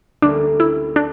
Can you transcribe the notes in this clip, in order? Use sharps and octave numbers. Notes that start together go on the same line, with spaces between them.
D2 D3 G3 A#3 C#4 D4
E4
D4